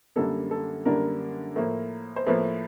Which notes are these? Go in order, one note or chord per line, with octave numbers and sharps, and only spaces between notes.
F#2 D3 G3 A#3 D4 A4
A4
F#2 D3 G3 A#3 D4 A#4
A2 F3 A#3
C5
A2 F3 A#3 B4